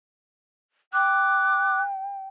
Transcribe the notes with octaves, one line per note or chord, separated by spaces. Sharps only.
G5 D6 F#6